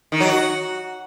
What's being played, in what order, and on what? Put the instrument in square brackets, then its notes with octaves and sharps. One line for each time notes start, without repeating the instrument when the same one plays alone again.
[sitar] D#3
F#3
F#4